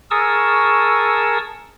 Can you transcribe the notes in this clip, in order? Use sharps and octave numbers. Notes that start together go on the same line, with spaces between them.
G#4 A#4 A5 C#6 D#6 E6